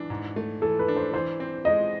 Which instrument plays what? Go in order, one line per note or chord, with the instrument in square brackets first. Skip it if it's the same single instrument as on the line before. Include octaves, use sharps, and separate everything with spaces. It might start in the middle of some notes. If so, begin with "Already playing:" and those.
Already playing: [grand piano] E3 D4
G#2
A3
[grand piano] E3 [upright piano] A4
[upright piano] B4
[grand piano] D4
[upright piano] C5
[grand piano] E3 [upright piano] C5
[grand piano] C4
[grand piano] G#3 [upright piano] D#5